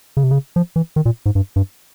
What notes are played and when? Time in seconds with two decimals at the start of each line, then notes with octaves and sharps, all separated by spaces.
0.17 C#3
0.24 C3
0.31 C#3
0.56 F3
0.76 E3
0.96 D#3
1.06 A#2
1.26 G#2
1.35 G2
1.56 G2